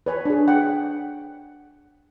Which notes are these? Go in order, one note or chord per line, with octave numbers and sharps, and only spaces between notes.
B4 C#5 G#5
D4 G#4
F#5 G5